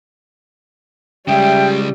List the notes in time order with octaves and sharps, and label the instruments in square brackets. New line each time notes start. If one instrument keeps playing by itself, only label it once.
[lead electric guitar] C#3 G#3 [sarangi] G3 [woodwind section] E5 G5